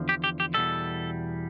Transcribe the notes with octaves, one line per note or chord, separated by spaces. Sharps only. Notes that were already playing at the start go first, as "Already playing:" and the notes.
Already playing: E2 D3 F3
G4
G4
G4
E2 B2 G3 A4